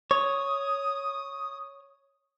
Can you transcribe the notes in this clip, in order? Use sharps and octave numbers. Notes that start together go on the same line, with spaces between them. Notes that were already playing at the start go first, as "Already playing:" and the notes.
C#5 D#6